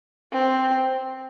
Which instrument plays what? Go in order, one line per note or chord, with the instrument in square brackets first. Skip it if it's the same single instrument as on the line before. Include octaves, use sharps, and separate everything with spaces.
[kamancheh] C4